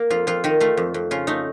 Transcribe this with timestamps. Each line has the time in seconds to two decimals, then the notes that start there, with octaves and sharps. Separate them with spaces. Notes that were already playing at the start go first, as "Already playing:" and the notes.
Already playing: A#3
0.10 F2 F4
0.27 F2 F4
0.44 D#3 D#4
0.60 A3 F4
0.77 F2
0.94 F2
1.11 C#3 F4
1.27 A3 D#4